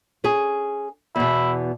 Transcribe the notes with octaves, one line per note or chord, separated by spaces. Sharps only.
C#4 G#4
E2 B2 E4